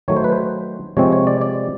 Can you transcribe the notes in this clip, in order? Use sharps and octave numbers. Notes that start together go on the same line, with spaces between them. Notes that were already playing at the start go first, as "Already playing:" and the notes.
D#3 F#3 A3 C#5
C5
B4
C5
C3 F3 G#3 C4 C#5
C#5
D5
D5